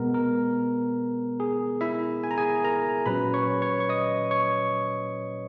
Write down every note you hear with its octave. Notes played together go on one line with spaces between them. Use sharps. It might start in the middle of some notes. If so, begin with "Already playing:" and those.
Already playing: B2 G#3 B3 A#4
A#4
G#4
E4 E5
G#5
A#5
G#4 G#5
A#4 A#5
A#2 F#3 C#4 B4 B5
C#5 C#6
C#5 C#6
C#6
D#5 D#6
C#5 C#6